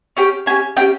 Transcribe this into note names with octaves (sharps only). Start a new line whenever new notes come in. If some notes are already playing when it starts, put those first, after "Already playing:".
C#4 G4 G5
C#4 G4 G#5
C#4 E4 G4 G5